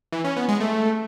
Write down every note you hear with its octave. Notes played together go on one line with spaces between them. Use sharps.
E3
C#4
B3
G#3
A3